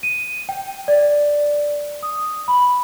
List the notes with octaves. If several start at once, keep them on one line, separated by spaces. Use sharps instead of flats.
D#7
G5
D5
D#6
B5